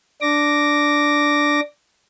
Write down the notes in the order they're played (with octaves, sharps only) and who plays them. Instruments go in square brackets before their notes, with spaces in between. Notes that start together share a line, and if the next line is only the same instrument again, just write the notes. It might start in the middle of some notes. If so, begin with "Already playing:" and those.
[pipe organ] D4 D6 A#6